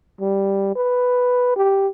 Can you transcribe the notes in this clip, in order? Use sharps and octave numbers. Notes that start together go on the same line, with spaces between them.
G3
B4
G4